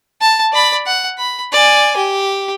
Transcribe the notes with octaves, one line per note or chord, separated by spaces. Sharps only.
A5
D5 B5
F#5
B5
D5 G#5
G4